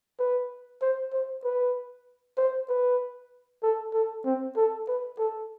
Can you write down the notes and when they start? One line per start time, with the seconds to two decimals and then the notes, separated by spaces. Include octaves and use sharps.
0.19 B4
0.82 C5
1.13 C5
1.44 B4
2.37 C5
2.69 B4
3.63 A4
3.94 A4
4.25 C4
4.57 A4
4.88 B4
5.18 A4